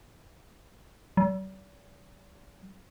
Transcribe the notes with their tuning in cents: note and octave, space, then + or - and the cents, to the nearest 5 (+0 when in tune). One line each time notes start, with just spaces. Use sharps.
G3 -45